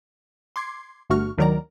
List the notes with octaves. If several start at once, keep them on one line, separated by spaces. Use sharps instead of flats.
C6 D6 G#6 C7
G1 G2 A3 F#4 C#6 F6
D2 D#3 F#3 A#4 D5 A#5